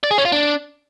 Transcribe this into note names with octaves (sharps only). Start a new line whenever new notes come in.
D5
G#4
C#4
F4
D4